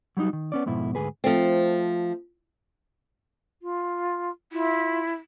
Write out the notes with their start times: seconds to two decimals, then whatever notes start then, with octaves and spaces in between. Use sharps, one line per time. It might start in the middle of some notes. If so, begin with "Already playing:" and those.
0.17 F#3 G3 C#4 D#4 F#4
0.33 D#3
0.52 B3 C#4 D5
0.66 F2 G#2 B2 E4
0.95 D2 G#2 G#4 B4
1.24 F3 A3 C4
3.62 F4
4.52 E4 F4